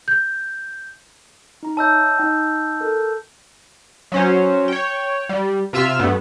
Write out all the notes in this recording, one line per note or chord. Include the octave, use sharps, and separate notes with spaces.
G6
D#4 A#5
C#5 D#5 E5 A5 E6 G6
D#4 D#5 G5
A4 A#4
F#3 C#4 C5
C#5 G5
G3
C3 F4 E5 E6 F6
G2 A3 B3